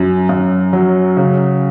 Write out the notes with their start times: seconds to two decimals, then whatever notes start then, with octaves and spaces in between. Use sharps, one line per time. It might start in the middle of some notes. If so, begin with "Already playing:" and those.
Already playing: F#2
0.29 F#2
0.73 F#3
1.17 C#3